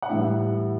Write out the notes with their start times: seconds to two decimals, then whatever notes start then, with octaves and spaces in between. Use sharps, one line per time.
0.02 F#5
0.09 A2 E3 G3 E5